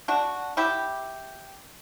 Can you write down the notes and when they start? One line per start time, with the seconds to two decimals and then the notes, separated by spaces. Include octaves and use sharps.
0.08 D4 F#4
0.57 E4 G4